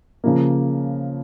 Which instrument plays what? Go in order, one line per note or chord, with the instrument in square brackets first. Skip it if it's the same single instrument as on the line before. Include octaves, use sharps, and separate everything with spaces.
[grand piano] C#3 F3 A#3